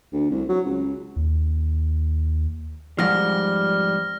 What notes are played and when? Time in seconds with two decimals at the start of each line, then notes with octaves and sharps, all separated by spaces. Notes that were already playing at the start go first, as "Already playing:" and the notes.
0.13 D2
0.31 C2
0.49 F#3
0.66 C#2
1.16 D#2
2.99 F2 G#2 F3 G3 F6 A#6